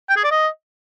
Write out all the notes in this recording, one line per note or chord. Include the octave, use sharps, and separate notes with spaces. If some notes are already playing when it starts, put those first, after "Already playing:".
G5
G#4
D5
D#5